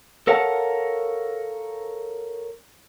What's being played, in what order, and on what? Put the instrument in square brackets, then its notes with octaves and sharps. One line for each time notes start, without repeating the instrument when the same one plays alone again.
[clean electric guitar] A4 A#4 C#5 F5 F#5 A5